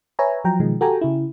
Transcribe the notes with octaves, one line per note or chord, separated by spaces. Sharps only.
B4 C#5 E5 G#5 A#5
F3 F#3 G5 A#5
B2 D#3 F3 G#3
F#4 G4 A4 G5 G#5 A#5
C#3 E4